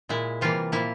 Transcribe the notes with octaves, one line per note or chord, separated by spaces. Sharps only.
A#2 G#3 E4
C3 E3 G3 A#3 F4
A#2 F3 A#3 E4